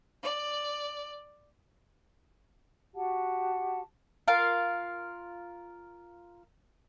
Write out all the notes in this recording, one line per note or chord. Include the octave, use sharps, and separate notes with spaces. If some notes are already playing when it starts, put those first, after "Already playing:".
D5
F#4 G4 F#5 A5
F4 A#4 F5